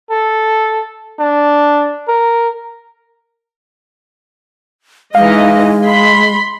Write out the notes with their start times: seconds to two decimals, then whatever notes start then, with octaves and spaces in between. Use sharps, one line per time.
0.11 A4
1.19 D4
2.08 A#4
5.15 E3 G#3 D#4 D#5 F5
5.86 B5 C6